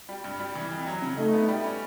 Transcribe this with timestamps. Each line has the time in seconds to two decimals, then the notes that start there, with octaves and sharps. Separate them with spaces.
0.09 G3
0.24 G2
0.40 G3
0.55 E3
0.71 F2
0.86 F#3
1.02 C#3
1.17 A3 D#4
1.33 B3
1.48 G3
1.64 C#4